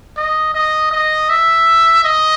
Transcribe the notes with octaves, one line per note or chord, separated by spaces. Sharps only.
D#5
D#5
D#5
E5
D#5